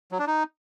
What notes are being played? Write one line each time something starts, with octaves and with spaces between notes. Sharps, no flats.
F#3
D4
D#4